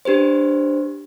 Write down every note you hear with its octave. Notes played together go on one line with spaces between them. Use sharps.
D4 G4 B4 C5